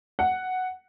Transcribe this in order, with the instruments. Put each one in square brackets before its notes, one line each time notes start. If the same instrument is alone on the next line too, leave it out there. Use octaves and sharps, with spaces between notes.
[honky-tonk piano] F#5